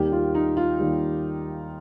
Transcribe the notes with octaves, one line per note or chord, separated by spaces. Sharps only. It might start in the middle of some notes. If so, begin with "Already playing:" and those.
Already playing: D#2 D#3 G3 G4
F4
D#4
F4
D#2 D#3 G3